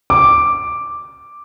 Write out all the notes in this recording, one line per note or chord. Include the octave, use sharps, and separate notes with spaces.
D6